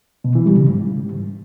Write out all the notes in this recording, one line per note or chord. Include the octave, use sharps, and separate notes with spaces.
B2
E3
G3
C#3
G#2